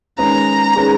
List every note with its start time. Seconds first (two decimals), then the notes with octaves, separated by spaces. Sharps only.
0.18 D#3 G#3 C#4 G#4 B4 A#5
0.75 D#3 G#3 C#4 G#4 B4